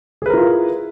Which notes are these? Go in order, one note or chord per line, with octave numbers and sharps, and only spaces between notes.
E4 F4 G#4 A#4 B4